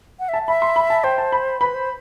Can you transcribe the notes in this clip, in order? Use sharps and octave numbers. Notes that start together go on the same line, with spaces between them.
F#5
E5 A5
E5 B5
C6
B5
A5
C5 G5
A5
B5
B4 B5
C5